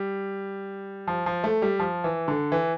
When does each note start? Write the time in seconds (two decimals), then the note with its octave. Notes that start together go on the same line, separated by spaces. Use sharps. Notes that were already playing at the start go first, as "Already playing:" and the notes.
Already playing: G3
1.08 F3
1.26 F3
1.44 A3
1.62 G3
1.80 F3
2.04 E3
2.28 D3
2.52 E3